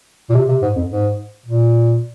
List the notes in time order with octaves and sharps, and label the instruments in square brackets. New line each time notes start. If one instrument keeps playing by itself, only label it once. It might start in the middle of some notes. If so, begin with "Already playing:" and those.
[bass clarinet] A#2
C3
C3
G#2
F2
G#2
A#2